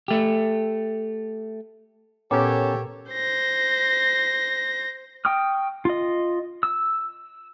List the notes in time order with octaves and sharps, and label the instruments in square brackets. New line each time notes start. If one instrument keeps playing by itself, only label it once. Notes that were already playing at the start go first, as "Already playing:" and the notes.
[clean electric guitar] A3 G4
[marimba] A#2 D6 [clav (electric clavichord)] B3 C#4 A#4 [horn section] G4 A4 C#5
[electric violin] C5 A#6
[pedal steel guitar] G5 C#6 D#6 F6
F4 D#5
E6